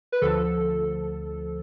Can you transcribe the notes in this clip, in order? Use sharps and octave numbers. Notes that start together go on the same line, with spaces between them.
B4
D2 D3 F3 A4